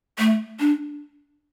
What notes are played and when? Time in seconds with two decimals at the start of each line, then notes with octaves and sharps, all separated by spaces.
0.19 A3
0.60 D4